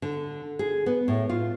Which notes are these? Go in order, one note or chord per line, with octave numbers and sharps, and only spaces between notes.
D3
G#4
B3
A2
F4